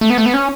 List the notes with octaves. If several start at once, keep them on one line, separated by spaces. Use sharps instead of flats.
A3
B3
A3
B3
C#4